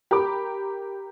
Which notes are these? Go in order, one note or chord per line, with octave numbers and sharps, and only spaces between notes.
G4 A#4 B5 D6